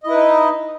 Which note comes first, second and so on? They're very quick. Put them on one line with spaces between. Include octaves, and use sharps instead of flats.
D#5 E4 B4 D#4